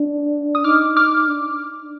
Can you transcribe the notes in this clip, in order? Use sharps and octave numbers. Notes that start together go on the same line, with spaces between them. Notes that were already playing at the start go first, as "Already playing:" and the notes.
Already playing: D4
D#6
D#4 D6 F6
D6 F6
D4